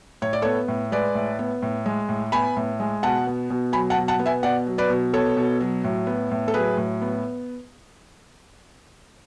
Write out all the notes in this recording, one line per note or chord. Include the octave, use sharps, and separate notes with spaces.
A2 C#5
D5
B3 A4 C#5
A2
G#3 B4 D5
A2
B3
A2
G#3
A2
B3 G#5 B5
A2
G#3
B2 F#5 A5
B3
B2
F#3 G#5 B5
F#5 A5
B2
F#5 A5
B3
E5 G#5
B2 D5 F#5
F#3
B4 D5
B2
B3 A4 C#5
B2
F#3
A2
B3
A2
A4
F#3 G#4 B4
A2
B3